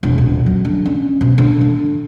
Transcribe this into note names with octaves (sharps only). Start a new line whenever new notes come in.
E1
D#1
F#3
D3
C#4
B2
D3
D3